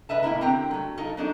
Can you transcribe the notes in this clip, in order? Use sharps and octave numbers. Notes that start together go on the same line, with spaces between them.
B4 D#5 E5 A5
A2 A#3 E4 A#4
D3 C4 G4 A#4 G5 A#5
F#3 A3
D#4 F4 A4 A#4
F#3 D4 D#4